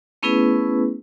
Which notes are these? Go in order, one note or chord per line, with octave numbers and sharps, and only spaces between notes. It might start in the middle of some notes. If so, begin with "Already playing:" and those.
A3 B3 C#4 E4 G#4 B4